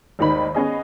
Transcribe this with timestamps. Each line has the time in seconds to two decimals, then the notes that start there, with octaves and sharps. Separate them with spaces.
0.19 G#1 D#2 D#3 D#4 B5
0.55 B3 C#4 G#4 D#5